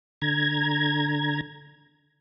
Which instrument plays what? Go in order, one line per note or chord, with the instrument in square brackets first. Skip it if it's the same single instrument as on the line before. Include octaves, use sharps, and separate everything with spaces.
[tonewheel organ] D3 A#5 G#6